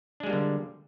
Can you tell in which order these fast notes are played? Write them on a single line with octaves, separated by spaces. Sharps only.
D4 G#3 G3 A#3 D3